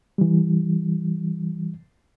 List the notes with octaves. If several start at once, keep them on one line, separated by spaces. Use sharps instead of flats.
E3 G3